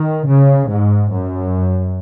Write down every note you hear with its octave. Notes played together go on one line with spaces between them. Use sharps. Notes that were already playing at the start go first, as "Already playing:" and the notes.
Already playing: D#3
C#3
G#2
F#2